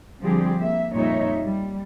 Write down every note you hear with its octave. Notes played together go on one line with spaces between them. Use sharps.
D3 F3 G3 C4 G4 G#4
A#3 E5
F2 A#2 G3 D#4 C#5 E5
G3